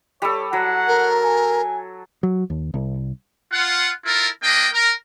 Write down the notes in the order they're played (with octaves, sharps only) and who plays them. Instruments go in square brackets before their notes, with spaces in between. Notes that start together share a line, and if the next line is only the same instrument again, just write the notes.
[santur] G3 A4 [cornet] C#5
[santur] F#3 [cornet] F#5
[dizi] A#4
[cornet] G#5
[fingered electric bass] F#3
D#2
C2
[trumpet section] F4 F#5
E4 F4 A4 A#4
A#3 D4 D#5 G5
A#4